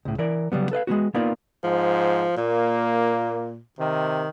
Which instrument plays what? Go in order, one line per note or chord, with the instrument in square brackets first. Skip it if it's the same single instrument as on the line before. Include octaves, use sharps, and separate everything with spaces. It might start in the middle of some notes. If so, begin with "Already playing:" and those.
[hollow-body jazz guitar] C#2 A2
E3 A#4 D5
C#3 F#3 G3 B3
A4 B4 D#5 F5
G#3 A#3 B3 F#4
A#3 B3 D#4 F4 A#4 D5
[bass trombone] G#2 [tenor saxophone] F3
[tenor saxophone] A#2 [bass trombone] A#3
[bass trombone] C3 [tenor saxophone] D#3